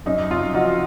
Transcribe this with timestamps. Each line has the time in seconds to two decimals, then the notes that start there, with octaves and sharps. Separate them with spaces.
0.06 F#2 D#4
0.31 F#2 F4
0.54 F3 D#4 F#4